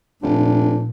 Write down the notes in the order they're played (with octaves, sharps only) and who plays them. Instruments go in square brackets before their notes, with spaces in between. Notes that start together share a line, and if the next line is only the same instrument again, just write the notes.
[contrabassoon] F1 [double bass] A#2 [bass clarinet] D4